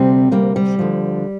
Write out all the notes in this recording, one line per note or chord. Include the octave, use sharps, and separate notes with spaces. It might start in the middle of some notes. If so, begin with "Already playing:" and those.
Already playing: D2 C3 G3 C4
D2 C3 G3 A#3
G3
D2 D3 F3